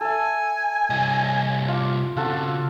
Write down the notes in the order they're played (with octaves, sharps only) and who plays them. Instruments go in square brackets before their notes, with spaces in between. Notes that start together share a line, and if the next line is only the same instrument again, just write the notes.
[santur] A4 E5 [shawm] G#5
[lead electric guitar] C2 D#5
[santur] F4 D6
[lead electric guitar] C#3 C4 [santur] F4 F#4 A4